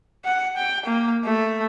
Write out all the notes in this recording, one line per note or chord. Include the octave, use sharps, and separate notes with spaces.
F#5
G5
A#3
A3